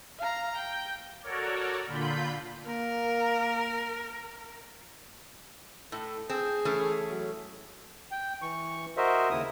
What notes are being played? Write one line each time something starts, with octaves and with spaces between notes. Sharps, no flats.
F5 A#5
G5
F#4 A4 A#4 C#5 D5
A#2 D3 F4 B5 G6
A#3 A#4
A2 A4
C4 G#4
E3 A3 C#4
F#3
G5
E3 C#6
F#4 A#4 C5 D#5 E5
D#2 C#3 E4 D#6